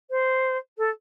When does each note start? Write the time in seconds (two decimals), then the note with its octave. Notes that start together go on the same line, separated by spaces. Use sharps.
0.10 C5
0.77 A4